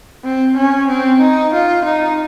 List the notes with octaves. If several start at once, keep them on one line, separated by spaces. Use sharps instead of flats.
C4
C#4
C4
D#4
F4
D#4